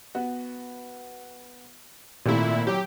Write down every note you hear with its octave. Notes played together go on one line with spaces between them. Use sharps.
B3 F#4
G#1 A#2 A3 E4
F#3 G4